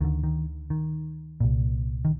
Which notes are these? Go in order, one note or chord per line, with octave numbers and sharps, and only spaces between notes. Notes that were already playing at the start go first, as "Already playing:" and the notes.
D2 D3 D#3
D#3
D#3
C2 A#2
D#3